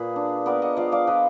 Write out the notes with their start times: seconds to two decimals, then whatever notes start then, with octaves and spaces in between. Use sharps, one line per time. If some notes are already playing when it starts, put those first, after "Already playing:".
Already playing: A#2 G#4 B4
0.16 D4
0.46 B3 A#4 D5
0.62 D#5 F#5
0.77 F3 D5 F5
0.92 D5 F5
1.07 F3 B4 D#5